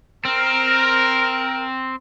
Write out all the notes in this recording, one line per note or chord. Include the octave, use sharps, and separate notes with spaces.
C4 A#4